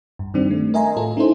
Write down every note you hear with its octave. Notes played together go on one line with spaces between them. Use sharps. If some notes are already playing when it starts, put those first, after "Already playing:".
G2
D#3 G3 C4 D4
A3
A#4 D#5 E5 G#5 A#5 C6
A2 F4 A4
C#4 D#4 E4 A4 C5